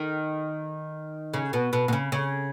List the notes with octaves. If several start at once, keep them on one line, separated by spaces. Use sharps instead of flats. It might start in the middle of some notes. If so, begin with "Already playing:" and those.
Already playing: D#3
C#3
B2
B2
B2
C#3
C#3